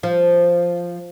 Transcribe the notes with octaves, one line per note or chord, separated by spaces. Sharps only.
F3